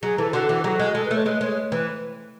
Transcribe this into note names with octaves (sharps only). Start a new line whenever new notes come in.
F#3 G#4
E3 A4
D3 F#4
E3
F#3 F#4 G#4
G#3
G#3 A4
B4
A3 C#5
G#3 B4
G#3 C#5
E3 B4